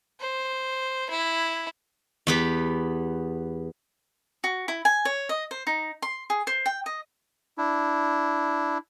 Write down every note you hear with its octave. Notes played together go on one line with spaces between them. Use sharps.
C5
E4
E2 B3 G4
F#4
E4
G#5
C#5
D#5
C5
D#4
C6
G#4
C5
G5
D#5
D4 E4